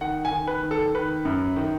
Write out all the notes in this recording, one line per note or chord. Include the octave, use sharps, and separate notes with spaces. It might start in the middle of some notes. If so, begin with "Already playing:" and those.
D#3 F#5
G#5
D#3
B4
D#3
A4
D#3 B4
F#2
D#3